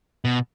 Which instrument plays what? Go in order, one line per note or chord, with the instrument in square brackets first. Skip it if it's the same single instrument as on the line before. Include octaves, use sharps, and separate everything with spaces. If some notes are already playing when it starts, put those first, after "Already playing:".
[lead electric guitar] B2